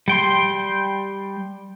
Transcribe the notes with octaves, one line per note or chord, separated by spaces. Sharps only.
G3 G5 C6